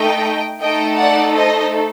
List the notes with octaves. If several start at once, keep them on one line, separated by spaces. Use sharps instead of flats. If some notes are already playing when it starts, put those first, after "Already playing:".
Already playing: A3 D#4 A4 D#5 G5
A3 D#4 A4 D#5 G5
D5 F#5
C5 D#5